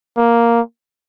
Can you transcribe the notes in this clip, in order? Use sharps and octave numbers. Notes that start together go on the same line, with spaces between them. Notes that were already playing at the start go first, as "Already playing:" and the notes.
A#3